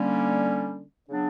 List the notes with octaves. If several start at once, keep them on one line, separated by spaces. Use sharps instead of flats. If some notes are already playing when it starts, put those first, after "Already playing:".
Already playing: D3 G3 A#3 C#4
C#3 F#3 B3 D4